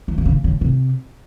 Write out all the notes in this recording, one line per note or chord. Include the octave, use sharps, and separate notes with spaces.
E3
D#3
C#3
C#3
C3